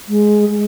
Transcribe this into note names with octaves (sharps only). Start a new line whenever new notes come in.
G#3
G#3